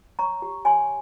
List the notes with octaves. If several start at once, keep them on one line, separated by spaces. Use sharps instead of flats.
C#5 A#5 C#6
G4
C#5 G#5 C6